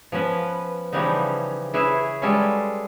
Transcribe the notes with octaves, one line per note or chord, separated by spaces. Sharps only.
F3 B3 C#4 B4
C#3 E3 F3 G3 B3 D#4
E4 G#4 B4 C#5 E5
G3 G#3 C#4 F4 G#4 A4